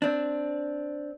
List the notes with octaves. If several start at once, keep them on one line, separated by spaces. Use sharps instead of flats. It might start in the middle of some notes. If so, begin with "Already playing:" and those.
C4 D4